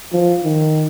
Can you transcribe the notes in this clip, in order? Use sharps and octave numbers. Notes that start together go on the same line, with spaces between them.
F3
D#3